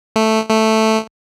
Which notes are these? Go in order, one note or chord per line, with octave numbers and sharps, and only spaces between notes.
A3
A3